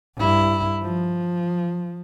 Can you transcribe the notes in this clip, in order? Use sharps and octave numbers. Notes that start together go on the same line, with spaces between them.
G2 E4
F3